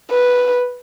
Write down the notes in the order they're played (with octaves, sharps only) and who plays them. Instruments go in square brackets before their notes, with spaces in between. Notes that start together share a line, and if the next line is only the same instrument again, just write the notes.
[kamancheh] B4